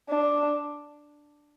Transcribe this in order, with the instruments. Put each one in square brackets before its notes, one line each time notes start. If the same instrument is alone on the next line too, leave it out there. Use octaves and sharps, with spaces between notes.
[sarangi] D4